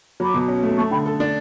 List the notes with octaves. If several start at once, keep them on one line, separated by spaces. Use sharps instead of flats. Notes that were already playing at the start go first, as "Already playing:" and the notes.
F#3 B5 D6
B2
C#4
A3
A3 A5 C#6
D3 G5 B5
A4
D4